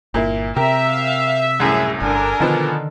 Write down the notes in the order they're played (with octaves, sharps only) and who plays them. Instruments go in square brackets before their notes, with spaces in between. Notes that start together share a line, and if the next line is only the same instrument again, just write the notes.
[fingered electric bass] G1 [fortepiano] A#2 A#3 E4
[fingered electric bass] C3 C4 [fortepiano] G4 A#4 [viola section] E5 [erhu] A#5
[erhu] F5
[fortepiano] C2 F#2 A2 [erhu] G#4
[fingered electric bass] G1 [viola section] D4 A4 A#4 [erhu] G#5
[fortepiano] B2 F3 B3 [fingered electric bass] D3 D#3